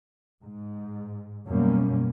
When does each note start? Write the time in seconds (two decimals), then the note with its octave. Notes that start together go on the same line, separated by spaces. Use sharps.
0.44 G#2
1.47 F#2 B2 G3 A#3 C#4